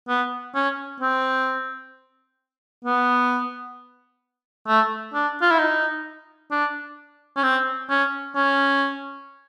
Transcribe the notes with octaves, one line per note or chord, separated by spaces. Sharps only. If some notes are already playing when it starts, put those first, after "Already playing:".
B3
C#4
C4
B3
A3
D4
F4
E4
D#4
D4
C#4
C4
C#4
C#4